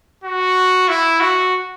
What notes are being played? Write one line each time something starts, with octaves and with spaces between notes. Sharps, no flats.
F#4
E4
F#4